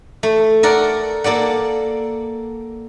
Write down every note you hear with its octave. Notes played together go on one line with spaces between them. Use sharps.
A3
A4 A#4 D5 F#5
A#3 A4 D5 F#5